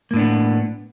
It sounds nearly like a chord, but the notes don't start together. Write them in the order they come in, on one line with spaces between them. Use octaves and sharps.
A#3 A2 D4 B3